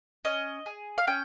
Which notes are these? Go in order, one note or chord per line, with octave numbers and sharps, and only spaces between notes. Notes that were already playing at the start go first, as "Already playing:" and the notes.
C#4 D#5
G#4
F5
C#4 G5